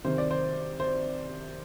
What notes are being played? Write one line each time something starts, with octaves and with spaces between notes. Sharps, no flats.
C3 D#3 C5
D5
C5
C5